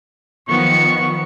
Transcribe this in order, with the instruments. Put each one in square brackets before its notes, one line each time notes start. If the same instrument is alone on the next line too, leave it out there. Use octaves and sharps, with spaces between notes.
[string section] D#3 F3 B3 [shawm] C#6